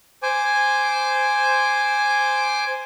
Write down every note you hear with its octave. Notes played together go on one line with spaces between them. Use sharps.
C5 G#5 D6